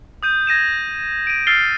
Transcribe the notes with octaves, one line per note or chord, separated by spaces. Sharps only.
D#6 G6 D#7
G#6 A#6 D#7 E7
D7 D#7
E6 F6 A6 C7 F7 G7